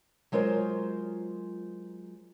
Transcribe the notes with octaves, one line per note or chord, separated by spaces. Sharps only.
F#3 G#3 F4 A#4 C5